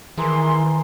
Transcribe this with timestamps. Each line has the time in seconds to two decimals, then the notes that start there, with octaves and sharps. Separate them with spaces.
0.18 D#3 E3 G#4 A#4 C6